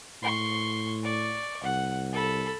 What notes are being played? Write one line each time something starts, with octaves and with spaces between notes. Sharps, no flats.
A2 C6 C#6
D5 C#6
C2 F#5
A4 B5